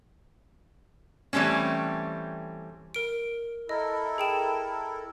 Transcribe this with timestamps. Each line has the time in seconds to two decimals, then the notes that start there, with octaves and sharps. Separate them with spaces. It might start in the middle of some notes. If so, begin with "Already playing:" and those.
1.33 E3 G3 A3 C4 C#4
2.94 A#4 D7
3.69 E4 A4 A#4 D#5
4.18 G#4 G5 E7